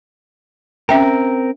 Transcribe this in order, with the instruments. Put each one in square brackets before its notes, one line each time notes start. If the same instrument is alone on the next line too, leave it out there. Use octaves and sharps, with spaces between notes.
[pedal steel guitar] C4 A#4 [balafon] C#4 E5 G5